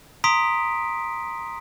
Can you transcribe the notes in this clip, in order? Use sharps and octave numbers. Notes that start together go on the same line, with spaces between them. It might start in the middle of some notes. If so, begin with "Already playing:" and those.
A#5 C6 D#6 B6 D7